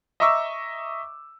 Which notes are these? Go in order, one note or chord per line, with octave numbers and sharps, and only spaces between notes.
D#5 E5 A#5 C#6 D6 E6